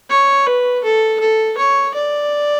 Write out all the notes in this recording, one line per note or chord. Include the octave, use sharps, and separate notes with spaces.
C#5
B4
A4
A4
C#5
D5